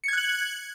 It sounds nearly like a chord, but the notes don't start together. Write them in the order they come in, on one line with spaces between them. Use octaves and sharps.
C#7 G#6 F#6 F#7